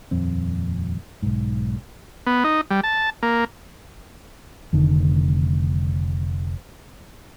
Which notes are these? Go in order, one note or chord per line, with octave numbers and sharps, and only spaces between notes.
D#1 F2 C4
B1 G#2
B3
D#4
G3
A5
A#3
F1 D3 D#3